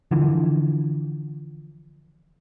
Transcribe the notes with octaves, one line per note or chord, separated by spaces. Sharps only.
D3 E3 F3